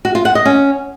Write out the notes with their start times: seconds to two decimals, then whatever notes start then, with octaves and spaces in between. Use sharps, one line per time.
0.05 F#4
0.15 F4
0.25 F#5
0.35 D#5
0.45 C#4